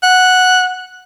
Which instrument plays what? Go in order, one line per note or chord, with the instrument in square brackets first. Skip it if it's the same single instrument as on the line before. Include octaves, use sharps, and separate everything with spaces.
[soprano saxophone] F#5